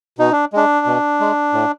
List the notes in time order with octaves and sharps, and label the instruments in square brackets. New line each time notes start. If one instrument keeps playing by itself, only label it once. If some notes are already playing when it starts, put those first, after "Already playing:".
[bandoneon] B2 D#4
D4
G#3 D4
B2
G#3
A2